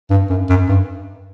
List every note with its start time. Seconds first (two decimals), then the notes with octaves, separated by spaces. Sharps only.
0.10 G2
0.29 F#2
0.49 F#2
0.69 G2